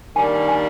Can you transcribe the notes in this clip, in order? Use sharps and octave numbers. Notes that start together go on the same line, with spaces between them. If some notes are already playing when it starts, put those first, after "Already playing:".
D#3 G3 A#3 D4 G#5
G#5